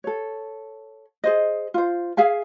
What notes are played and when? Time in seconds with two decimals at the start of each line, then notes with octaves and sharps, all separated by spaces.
0.04 A4 C#5
1.24 G#4 C5 D#5
1.74 F4 C5
2.17 G#4 E5 F5 G#5